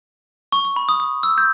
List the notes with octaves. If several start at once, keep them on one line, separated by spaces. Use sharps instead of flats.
C#6
C#6
B5
D#6
D#6
E6
G6